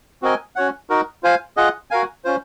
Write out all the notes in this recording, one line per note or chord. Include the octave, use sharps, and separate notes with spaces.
C4 F#4 A#4 D#5 G#5
C#4 F#4 C#5 F#5
D#4 F#4 A#4
F4 C5 F5 G#5
F4 G#4 D#5 F#5
F#4 A#4 F5 G#5
C#4 F4 C5